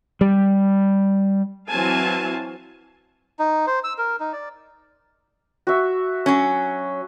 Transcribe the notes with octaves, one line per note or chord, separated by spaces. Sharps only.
G3
E3 F#3 C4 F5 G#5 A5
D#4
C5
E6
A#4
D#4
D5
F#4 E5
F#3 C#4